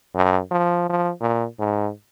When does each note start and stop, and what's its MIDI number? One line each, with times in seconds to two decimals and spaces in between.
0.15 0.39 42
0.51 0.86 53
0.90 1.10 53
1.20 1.45 46
1.59 1.90 44